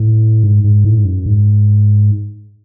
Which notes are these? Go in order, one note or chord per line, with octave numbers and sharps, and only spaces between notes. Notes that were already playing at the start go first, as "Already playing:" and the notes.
Already playing: A2
G#2
G#2
A2
G#2
F#2
G#2